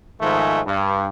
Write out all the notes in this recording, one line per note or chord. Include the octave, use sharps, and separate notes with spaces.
G#2 D#3 F3 G#3 A3
G2